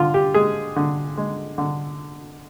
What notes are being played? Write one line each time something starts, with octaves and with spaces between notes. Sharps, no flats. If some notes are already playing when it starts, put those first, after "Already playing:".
Already playing: D3 F4
G4
G#3 G#4
D3
G#3
D3